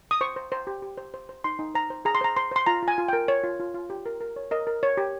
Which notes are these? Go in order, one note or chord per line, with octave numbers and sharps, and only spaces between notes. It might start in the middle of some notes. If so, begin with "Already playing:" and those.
D#6
C5 C#6
C5
C5
G4
G4
C5
C5
C5
D#4 C6
D#4
C5 A#5
C5
G#4 A#5
C6
C5 A#5
C5 C6
C5 C6
F4 A#5
F4
G#5
F4
A#4 G5
C#5
F4
F4
F4
G4
A#4
A#4
C#5
A#4 D#5
A#4
C#5
G4